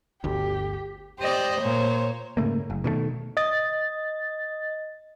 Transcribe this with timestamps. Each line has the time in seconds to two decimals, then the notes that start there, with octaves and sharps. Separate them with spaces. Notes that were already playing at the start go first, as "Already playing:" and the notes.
0.24 G1 D2 G4
1.19 G4 C5 D5 D#5
1.61 A#2 C5 C#5
2.37 G#2 C#3 A3 A#3
2.70 F#1
2.84 B2 D#3 F#3 A3
3.37 D#5 A6